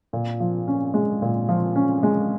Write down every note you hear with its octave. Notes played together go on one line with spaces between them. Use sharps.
A#2
F3
C#4
G#3
A#2
F3
C#4
G#3